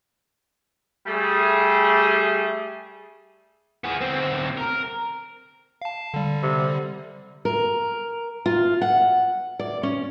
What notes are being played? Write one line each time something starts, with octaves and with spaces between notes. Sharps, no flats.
G3 A3 G#4
B3 G#4
D2 C4
A#4
F5 A5
D3 G3
C3
A#4
F4
F#5
D5
C#4